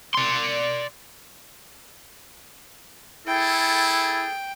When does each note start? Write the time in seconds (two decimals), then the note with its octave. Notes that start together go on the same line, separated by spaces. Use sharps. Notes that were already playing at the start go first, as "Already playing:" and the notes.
0.14 D5 C6
3.27 E4 G#4 A4 G5